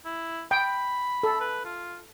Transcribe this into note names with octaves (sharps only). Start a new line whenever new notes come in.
E4
G5 B5
A4
B4
F4